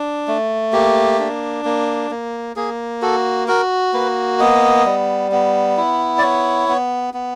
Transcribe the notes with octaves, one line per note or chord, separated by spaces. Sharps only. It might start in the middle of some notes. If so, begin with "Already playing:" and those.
Already playing: D4
A3
A#3 G4
D4
A#3
A#3
A#3 G#4
F#4 A4
F#4 A#4
A#3 B4
B3 D#5
G3
B3
E4
D5
B3 C#5
B3
B3